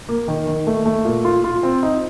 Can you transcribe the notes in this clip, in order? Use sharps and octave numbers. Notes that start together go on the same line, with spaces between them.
A#3
D#3
D#3
A3
A3
A#2
F4
F4
C4
D#4